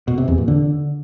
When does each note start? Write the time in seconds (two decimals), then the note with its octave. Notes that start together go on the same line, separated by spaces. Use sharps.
0.08 B2
0.18 C3
0.28 E2
0.38 A#2
0.48 D3